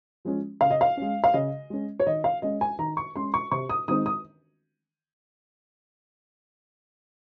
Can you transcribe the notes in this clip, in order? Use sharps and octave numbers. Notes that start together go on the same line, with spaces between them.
F3 G#3 C#4
C#3 F5
D#5
F5
G#3 C#4
F5
C#3 D#5
G#3 C#4
C#5
D#3 D#5
F5
G#3 C#4 D#5
G#5
D#3 A#5
C#6
G#3 C#4 C6
C#6
C3 C#6
D#6
D#3 G#3 C4 D#4 D#6
D#6